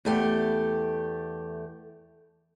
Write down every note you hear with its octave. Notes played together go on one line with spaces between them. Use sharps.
E2 A3 G4